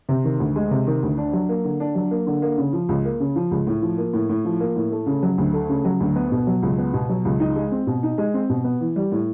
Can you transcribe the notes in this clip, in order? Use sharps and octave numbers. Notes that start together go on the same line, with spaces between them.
C3
D#3
D2
G#3
C3
D#3
D2
D4
F#3
A#3
D3
D4
F#3
A#3
D3
A#3
C#3
F3
C#2
A#3
C#3
F3
C#2
A2
F3
A#3
A2
A2
F3
A#3
A2
A3
C#3
F#3
D2
A3
C#3
F#3
D2
B3
B2
F#3
C#2
B3
B2
F#3
C#2
D#4
G#3
C4
B2
D#4
G#3
C4
B2
B3
E3
G3
A2